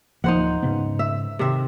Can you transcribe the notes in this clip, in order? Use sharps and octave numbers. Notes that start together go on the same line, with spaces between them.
D1 F3 A#3 D#4 C5 F#5
G#2 C#3 B3
E5
C3 D#3 E5